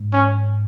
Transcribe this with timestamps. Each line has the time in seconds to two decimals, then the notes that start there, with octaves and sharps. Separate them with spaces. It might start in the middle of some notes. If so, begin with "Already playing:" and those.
Already playing: G#2
0.13 C#4